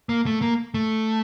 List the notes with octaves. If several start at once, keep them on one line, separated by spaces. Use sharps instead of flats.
A#3
A3
A#3
A3